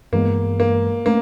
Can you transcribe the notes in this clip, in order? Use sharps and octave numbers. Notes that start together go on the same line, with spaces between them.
G2 E3 G#3 A#3 B3
A#3
A3 A#3 C#4